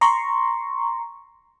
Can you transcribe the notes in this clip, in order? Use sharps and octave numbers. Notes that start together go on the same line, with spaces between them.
A#5 C6 C#6